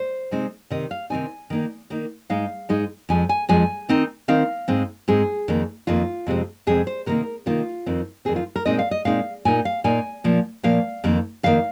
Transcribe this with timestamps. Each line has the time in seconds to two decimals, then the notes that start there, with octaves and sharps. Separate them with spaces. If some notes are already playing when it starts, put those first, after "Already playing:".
Already playing: C5
0.31 C3 G#3 C4 D#4
0.70 C3 D#3 C4 D#4 D#5
0.91 F5
1.10 C3 D#3 C4 D#4 G#5
1.50 D#3 A#3 D#4
1.90 D#3 A#3 D#4
2.30 G#2 G#3 D#4 F5
2.69 G#2 G#3 D#4
3.09 F2 F3 G#3 G#5
3.29 G#5
3.49 F2 F3 G#3 G#5
3.89 D#3 C4 D#4
4.28 D#3 C4 D#4 F5
4.68 G#2 G#3 C4
5.08 G#2 G#3 C4 G#4
5.48 F2 D#3 A#3
5.87 F2 D#3 A#3 F4
6.27 F2 C3 G#3 C4
6.67 F2 C3 G#3 C4 G#4
6.87 C5
7.06 C3 D#3 A#3 D#4 A#4
7.46 C3 D#3 A#3 D#4 F4
7.86 F2 D#3 C4
8.25 F2 D#3 C4 G#4
8.36 F4
8.56 A#4
8.65 A#2 G#3 C4 D#4 D#5
8.79 F5
8.91 D#5
9.05 A#2 G#3 C4 D#4 F5
9.45 A#2 A#3 D#4 G#5
9.65 F5
9.84 A#2 A#3 D#4 G#5
10.24 A#2 F3 A#3
10.63 A#2 F3 A#3 F5
11.04 F2 D#3 A#3
11.43 F2 D#3 A#3 F5